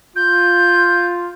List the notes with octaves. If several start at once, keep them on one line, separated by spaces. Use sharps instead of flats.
F4 G6